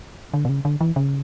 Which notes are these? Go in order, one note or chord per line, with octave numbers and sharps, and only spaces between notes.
D3
B2
C#3
D3
E3
C#3